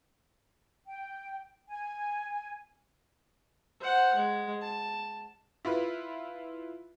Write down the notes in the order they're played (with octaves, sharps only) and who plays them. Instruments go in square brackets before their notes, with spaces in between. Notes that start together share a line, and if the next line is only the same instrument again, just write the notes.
[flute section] G5
G#5
[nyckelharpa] C5 F#5
G#3
A5
[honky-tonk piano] E4 F4 B4